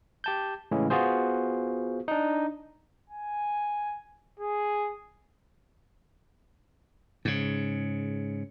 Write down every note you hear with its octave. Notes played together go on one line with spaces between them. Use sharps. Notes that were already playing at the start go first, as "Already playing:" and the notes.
G4 A5 G6
A2 C#3 E3 G#3
B3 F4 F#4 G#4 C5
D4 D#4
G#5
G#4
G#2 C#3